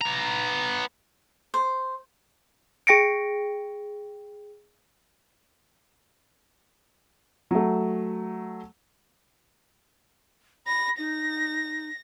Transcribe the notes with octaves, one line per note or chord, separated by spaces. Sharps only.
B3 A#5
C5
G#4 G5 A#6 C#7 D7
F#3 A3
B5 A#6
D#4 A#6